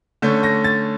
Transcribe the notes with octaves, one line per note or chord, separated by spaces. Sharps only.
D3 A3 C#4 G6
A#6
A6